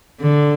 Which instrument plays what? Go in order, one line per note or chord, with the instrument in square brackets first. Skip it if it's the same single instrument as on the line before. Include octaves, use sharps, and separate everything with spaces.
[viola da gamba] D3